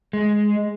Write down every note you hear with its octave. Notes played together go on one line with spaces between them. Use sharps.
G#3